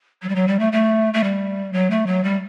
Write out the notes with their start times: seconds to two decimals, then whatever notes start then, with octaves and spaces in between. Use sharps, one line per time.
0.23 F#3
0.29 G3
0.35 F#3
0.48 G3
0.59 A3
0.73 A3
1.14 A3
1.24 G3
1.73 F#3
1.90 A3
2.07 F#3
2.24 G3